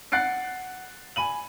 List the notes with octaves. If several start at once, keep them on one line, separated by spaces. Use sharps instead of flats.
F#5 F#6 A6 C7 D7
G#5 B5 D#7 F#7